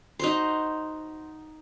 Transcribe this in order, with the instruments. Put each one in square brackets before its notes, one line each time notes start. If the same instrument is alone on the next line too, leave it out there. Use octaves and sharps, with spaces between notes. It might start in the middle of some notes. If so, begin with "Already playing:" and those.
[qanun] D#4 F#4 C5